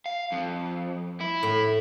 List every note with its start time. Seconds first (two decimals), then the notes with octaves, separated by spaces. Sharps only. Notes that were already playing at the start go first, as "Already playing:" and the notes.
0.06 F5
0.32 F2
1.21 E4
1.43 A2